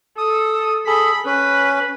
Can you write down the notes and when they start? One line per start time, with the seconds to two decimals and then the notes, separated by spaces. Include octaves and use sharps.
0.18 A4 D#6
0.87 G#4 A4 B5
1.26 C#4 B4